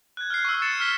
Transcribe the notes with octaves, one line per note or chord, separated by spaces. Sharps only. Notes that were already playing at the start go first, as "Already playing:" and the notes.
F#6 G#6
F6 F#6 C7
C#6 E6
A6 C#7 E7
F6 B6 G7